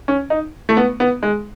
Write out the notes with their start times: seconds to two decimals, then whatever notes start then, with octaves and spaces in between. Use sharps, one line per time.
0.08 C#4
0.30 D#4
0.69 A3
0.77 B3
1.00 B3
1.23 G#3